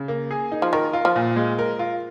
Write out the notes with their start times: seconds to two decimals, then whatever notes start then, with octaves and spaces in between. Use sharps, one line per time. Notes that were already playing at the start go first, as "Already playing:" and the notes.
Already playing: C#3
0.08 A#3
0.31 G#4
0.52 D#4
0.62 F3
0.73 D#3 A#4
0.93 F4
1.05 F3
1.16 A#2
1.36 G#3
1.58 A#4
1.79 F4